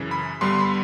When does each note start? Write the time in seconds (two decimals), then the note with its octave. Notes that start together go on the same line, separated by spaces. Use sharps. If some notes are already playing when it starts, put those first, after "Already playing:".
Already playing: F#2 C#3 E3
0.11 B5
0.41 G2 D3 G3 B3 C6
0.60 B5